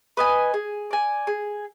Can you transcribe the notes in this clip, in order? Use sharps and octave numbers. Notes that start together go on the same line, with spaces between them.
B4 D#5 G#5
G#4
D5 G#5
G#4